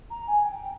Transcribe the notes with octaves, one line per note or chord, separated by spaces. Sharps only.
A#5
G#5
G5
G5